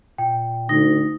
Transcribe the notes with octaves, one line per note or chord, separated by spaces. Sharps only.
A#2 G5
D2 D#4 A#6